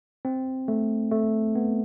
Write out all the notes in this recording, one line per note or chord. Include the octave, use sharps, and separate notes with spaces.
C4
A3
A3
B3